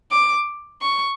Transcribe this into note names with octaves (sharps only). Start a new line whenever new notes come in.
D6
C#6